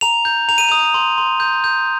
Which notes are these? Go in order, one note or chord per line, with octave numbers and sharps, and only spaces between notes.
A#5 F7
G6
A#5 F7
D#7
D#6 F7
C6
C6
G6
G6